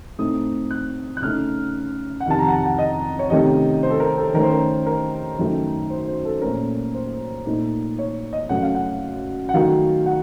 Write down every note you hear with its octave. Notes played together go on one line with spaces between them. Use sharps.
A2 A3 C4 D#4 D#6
F#6
F#6
C#3 A3 D#4 F6
F#5
F2 C3 D#3 A5
A#5
F#5
A5
F#5
D#5
C#5
C3 D#3 A3 C#4 D#5
C5
A4
A#4
A4
D#3 A3 C#4 A#4
C5
A#4
A#4
F#2 D#3 A3 D#4
C5
C5
A4
A#2 A3 C#4 A#4
C5
A#2 A3 D#4
C#5
D#5
F#2 C#3 A3 C#4 F#5
F5
F#5
F#5
D#3 F#3 A3 F5
F#5